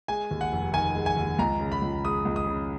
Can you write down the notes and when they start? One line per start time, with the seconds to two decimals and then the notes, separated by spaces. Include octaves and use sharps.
0.08 G#3 G#5
0.31 D#2
0.41 F#5
0.53 F1
0.73 D#3 G#5
0.95 G#3
1.06 G#5
1.17 D#2
1.39 C#2 A#5
1.60 C#3
1.72 B5
1.82 C#2
2.04 G#3 D#6
2.25 C#2
2.36 D#6
2.47 C#3